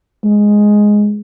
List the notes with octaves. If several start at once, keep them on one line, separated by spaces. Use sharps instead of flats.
G#3